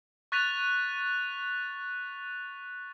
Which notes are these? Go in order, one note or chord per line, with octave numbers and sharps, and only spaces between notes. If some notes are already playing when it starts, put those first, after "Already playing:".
C#6 F#6 A6 B6 D#7 F7